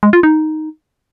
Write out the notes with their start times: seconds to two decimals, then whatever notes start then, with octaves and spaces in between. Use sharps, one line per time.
0.03 G#3
0.13 F4
0.23 D#4